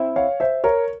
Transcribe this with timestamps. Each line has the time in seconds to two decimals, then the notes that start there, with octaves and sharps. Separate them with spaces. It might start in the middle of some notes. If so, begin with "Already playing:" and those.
Already playing: C4 E4
0.16 C#5 F5
0.40 C5 E5
0.64 A#4 C#5